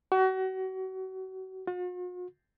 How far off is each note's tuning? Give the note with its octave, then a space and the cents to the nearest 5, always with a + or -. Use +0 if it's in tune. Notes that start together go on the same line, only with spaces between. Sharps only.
F#4 +35
F#4 -45